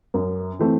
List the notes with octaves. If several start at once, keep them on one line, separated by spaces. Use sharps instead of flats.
F#2
E3 A3 C4